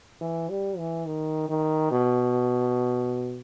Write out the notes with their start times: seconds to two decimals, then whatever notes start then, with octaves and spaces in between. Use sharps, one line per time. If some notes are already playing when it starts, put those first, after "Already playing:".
0.21 E3
0.50 G3
0.78 E3
1.06 D#3
1.49 D#3
1.91 B2